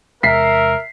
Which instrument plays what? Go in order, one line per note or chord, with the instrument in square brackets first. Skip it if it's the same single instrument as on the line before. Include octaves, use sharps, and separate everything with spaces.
[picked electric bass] E2 C3 G#3 [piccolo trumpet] A#4 [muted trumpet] E5 [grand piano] B6 C7